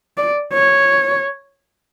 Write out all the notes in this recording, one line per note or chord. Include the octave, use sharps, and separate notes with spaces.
D5
C#5